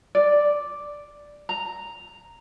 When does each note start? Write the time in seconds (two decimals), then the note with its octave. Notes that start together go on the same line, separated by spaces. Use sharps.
0.15 D5
1.49 A#5